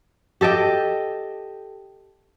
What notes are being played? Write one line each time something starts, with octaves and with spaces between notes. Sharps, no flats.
G4 A4 D#5 G5